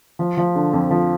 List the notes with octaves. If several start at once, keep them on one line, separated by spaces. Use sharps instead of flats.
F3
F3
D3
F2
F3